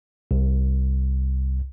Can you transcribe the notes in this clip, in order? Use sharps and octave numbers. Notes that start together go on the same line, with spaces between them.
C2